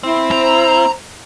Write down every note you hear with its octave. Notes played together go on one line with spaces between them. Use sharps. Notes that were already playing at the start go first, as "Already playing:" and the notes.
C4 E4
C5 A#5